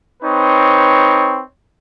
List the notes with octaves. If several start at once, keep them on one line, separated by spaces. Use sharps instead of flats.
C4 D#4 B4 C#5